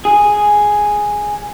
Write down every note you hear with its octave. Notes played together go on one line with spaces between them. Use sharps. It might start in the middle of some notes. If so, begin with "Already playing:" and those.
G#4